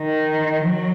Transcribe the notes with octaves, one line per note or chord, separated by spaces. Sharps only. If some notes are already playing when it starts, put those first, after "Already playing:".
Already playing: D#3
F#3